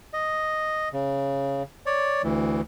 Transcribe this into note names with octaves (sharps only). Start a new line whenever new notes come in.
D#5
C#3
C#5 D5
D2 E3